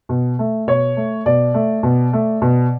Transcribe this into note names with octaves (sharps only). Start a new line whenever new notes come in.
B2
A3
B2 C#5
A3
B2 D5
A3
B2
A3
B2